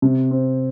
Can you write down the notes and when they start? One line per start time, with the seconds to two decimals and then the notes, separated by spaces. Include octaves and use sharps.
0.02 C3
0.31 C4